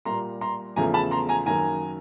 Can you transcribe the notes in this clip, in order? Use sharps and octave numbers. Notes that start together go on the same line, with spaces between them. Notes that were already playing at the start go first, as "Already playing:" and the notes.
A#2 G3 A#3 A#5 C6
A#5 C6
E2 C#3 F3 A3 G#5 A#5
A5 B5
A#5 C6
G#5 A#5
F#2 D#3 F#3 A#3 G#5 A#5